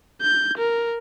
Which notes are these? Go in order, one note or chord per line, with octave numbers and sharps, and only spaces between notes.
G6
A#4